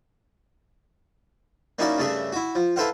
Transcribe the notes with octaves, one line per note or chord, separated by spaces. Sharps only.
A#3 C#4 D#4 E4 F#4 D5
G2 C#3 A3 G#4 E5
E4 F#4
F3
E4 A4 B4 C5 F5 F#5